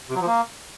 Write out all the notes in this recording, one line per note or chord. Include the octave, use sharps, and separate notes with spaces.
C3
F#3
F3
A#3